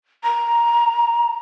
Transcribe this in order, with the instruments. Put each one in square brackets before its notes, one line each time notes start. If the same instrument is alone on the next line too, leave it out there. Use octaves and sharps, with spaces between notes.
[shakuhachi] A#5